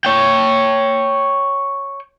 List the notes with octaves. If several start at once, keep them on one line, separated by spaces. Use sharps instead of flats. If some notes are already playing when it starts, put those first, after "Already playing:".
C#5 G5